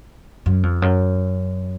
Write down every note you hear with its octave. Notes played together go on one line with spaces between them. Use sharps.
F#2
F2
F#2